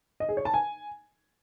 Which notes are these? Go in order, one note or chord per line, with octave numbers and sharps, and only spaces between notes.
D#5
G#4
C#5
A5
G#5